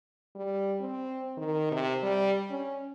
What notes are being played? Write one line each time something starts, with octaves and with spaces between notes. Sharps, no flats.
G3
C4
D#3
C3
G3
C#4